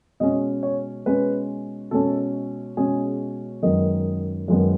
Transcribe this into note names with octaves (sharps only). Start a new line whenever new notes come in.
B2 G#3 C#4 D#5
C#5
B2 G#3 C#4 B4
B2 G#3 C#4 A4
B2 G#3 C#4 G#4
F#2 D#3 G#3 B3 D#5
F#2 D#3 G#3 B3